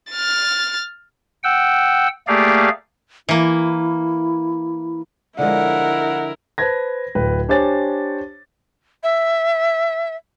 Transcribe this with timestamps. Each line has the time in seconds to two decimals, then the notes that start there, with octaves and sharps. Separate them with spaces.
0.11 F6 A6
1.44 F#5 G5 E6
2.28 A3 A#3 G4 G#4 D5 F5
3.29 E3 A#3 E4
5.39 D3 F3 G#3 E4 A#4 F#5
6.58 B4 C5 A5 G#6 A#6
7.15 D1 B4 G5
7.49 D4 G4 C5 C#5 G#5 A6
9.03 E5